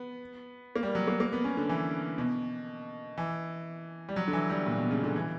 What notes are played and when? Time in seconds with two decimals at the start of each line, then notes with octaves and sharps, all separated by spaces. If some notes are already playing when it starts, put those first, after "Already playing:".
Already playing: B3
0.76 A#3
0.83 G3
0.95 F#3
1.07 A#3
1.20 A#3
1.33 B3
1.44 C#4
1.57 D3
1.69 E3
2.18 B2
3.18 E3
4.09 G3
4.16 F#3
4.28 D3
4.33 E3
4.50 G3
4.66 A#2
4.78 B2
4.91 C#3
5.04 D3
5.16 E3